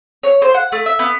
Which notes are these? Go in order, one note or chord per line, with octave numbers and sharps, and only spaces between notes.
C#5
C5
F#5
A3
E5
B3